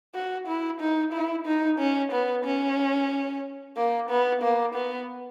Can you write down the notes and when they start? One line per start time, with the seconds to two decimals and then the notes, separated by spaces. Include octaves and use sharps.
0.15 F#4
0.47 E4
0.80 D#4
1.13 E4
1.46 D#4
1.79 C#4
2.12 B3
2.45 C#4
3.77 A#3
4.09 B3
4.42 A#3
4.75 B3